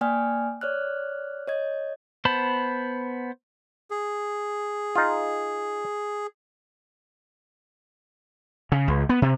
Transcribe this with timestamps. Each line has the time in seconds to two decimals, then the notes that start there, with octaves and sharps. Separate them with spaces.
0.01 A#3 D5 G5 G#5 F6
0.61 C#5 D5 F6 F#6
1.48 C#5 D#5 G#6
2.25 B3 C5 A5 B5
3.91 G#4
4.95 D#4 F4
8.72 C#3
8.88 C#2
9.09 B3
9.22 C3